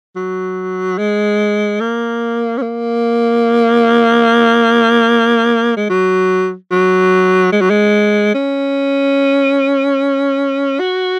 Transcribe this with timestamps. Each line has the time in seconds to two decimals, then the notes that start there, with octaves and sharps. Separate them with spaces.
0.16 F#3
0.98 G#3
1.80 A#3
2.58 C#4
2.62 A#3
5.76 G#3
5.90 F#3
6.71 F#3
7.52 G#3
7.61 F#3
7.70 G#3
8.34 C#4
10.80 F#4